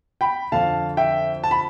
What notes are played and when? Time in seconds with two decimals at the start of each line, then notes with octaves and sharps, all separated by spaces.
0.21 G5 B5
0.52 F2 D3 F5 A5
0.97 E5 G5
1.44 A5
1.51 B5